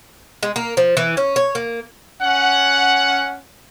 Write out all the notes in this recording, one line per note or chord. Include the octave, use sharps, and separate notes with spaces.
G#3
A#3
F3
E3
C#4
C#5
A#3
C#4 F#5